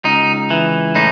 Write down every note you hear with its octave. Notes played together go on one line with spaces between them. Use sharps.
C#2 D#4
E3
A2 D#4